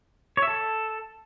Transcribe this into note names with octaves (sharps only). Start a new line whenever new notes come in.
C#5
E5
A4